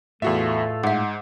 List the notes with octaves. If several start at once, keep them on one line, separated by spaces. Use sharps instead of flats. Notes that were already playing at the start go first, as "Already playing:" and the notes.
E2 A2 A3 F4 F#4 A4 E5
G#2 E5 F#5